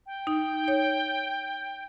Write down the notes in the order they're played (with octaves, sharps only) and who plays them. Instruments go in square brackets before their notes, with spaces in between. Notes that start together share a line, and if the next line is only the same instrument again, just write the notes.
[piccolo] G5
[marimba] D#4
C#5